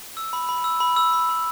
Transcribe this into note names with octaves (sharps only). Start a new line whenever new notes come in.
E6
B5
B5
E6
B5
E6
B5
B5